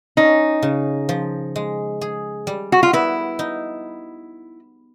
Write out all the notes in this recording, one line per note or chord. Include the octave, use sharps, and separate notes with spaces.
C#4 D#4
C#3
F3
G#3
G#4
G3
F#4
F4
B3 E4
D#4